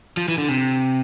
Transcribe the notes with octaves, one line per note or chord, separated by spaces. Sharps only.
F3
E3
D3
C3